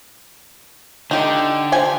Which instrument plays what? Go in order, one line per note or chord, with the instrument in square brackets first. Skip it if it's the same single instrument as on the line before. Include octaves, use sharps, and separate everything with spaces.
[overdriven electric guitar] D3 [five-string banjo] D#4 G4
[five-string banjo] F3 G4 G#5